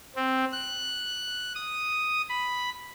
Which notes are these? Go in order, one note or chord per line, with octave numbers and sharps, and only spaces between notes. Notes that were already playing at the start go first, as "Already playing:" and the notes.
C4
F#6
D#6
B5